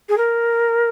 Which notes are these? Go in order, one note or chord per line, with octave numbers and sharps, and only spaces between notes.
G#4
A#4